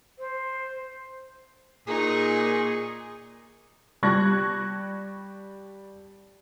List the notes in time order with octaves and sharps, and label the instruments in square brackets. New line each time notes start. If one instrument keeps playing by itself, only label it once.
[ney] C5
[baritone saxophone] A#2 [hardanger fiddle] D#4 C#6 [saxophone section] G#4
[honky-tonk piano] G3 A5 C#6 F#6 G#6 A#6